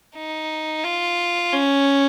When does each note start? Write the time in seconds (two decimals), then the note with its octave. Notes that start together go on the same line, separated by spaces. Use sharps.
0.15 D#4
0.83 F4
1.52 C#4